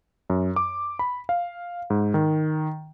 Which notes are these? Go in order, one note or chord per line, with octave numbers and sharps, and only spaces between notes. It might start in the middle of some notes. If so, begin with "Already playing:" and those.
F#2
D6
B5
F5
G#2
D#3